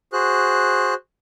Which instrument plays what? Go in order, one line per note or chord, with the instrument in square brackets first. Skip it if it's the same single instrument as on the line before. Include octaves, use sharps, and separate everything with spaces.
[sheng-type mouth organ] F#4 G#4 C5 F#6